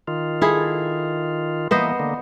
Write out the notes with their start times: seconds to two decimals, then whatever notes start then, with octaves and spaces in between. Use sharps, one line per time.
0.08 D#3 F4
0.42 E4 G#4 A4
1.71 E3 A#3 B3 C5 D#5
1.99 D3 A#3